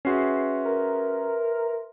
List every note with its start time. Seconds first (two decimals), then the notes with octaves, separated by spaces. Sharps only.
0.05 C#4 F#4 G#4 B4 E5 C6 C7
0.65 A#4